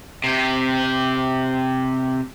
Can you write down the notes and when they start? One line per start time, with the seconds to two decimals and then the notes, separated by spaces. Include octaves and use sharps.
0.24 C3 G4